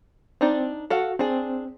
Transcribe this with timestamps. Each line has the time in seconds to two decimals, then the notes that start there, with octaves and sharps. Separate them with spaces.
0.41 C4 D4 D#4 D5
0.90 F#4 A4 F5 F#5
1.19 C4 D4 G#4